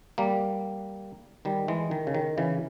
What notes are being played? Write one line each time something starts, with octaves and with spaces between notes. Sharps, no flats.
G3 A#3
D#3 G3
E3 G#3
D#3
C#3
D#3
C#3 E3